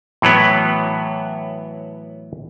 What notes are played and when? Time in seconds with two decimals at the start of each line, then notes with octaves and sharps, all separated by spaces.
0.22 A2 E3 F#3 B3